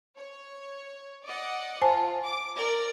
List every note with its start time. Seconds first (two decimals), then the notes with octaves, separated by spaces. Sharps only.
0.18 C#5
1.24 D5 D#5 F#5
1.82 F4 C5 G#5 A5
2.24 D6
2.56 A#4 D5